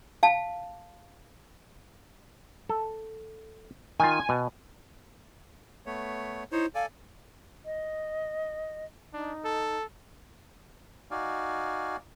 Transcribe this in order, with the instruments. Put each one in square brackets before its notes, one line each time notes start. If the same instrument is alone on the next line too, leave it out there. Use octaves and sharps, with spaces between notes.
[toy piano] F5 A5
[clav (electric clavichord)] A4
[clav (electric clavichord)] D#3 F4 [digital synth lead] G#5
[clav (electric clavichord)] B2
[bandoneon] A3 B3 C#5
[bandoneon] D#4 C5 C#5 [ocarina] E4
[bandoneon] A4 D5 G#5 [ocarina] F5
[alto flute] D#5
[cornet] D4 [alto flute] D#4
[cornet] A4
[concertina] D#4 F#4 D5 F5 G#5